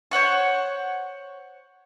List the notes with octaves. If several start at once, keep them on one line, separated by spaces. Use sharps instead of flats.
C5 C#5 F#5 C#6